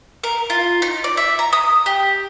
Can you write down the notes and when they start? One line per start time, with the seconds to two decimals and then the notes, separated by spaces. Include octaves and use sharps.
0.24 A#4
0.50 F4
0.82 D#4
1.04 D5
1.17 E5
1.39 A#5
1.53 D#6
1.86 G4